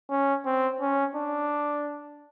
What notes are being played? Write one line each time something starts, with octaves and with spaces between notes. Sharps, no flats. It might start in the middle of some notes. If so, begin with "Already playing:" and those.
C#4
C4
C#4
D4